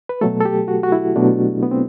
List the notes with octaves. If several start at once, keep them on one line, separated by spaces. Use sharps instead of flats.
B4
B2 F#3 A3 A4
A4
G4
F#4
F#4
E4
B2 F#3 A3 D4
B3
C4